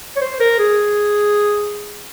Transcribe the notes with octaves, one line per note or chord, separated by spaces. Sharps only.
C#5
C5
A#4
G#4